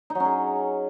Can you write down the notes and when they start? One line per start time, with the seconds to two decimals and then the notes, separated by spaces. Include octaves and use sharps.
0.10 D#4
0.15 F#3
0.20 C#4
0.25 G#4